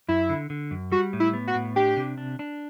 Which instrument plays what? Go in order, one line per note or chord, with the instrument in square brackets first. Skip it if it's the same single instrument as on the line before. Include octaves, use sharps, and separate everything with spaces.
[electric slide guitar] F#2 [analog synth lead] E4
[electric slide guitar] D3
D3
F#2
[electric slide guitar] G3 [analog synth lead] F#4
[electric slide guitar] A2
[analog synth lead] E4
[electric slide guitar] B3
[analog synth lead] F#4
[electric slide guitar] A2
[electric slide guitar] D4 [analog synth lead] G4
[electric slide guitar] C3
D4
D4